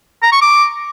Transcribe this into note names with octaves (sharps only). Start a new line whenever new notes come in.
A#5
C#6
D6